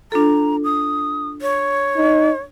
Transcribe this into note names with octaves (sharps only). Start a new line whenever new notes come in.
D4 F4 A4 A#5
D#6
C#5
D#4